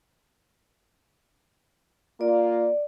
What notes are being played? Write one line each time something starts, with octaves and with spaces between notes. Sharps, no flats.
A#3 F4 D5